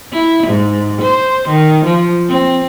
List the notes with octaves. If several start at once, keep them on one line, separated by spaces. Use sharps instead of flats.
E4
G#2
C5
D#3
F3
C4